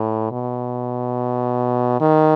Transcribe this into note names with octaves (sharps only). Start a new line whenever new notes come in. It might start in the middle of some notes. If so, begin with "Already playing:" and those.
Already playing: A2
B2
D#3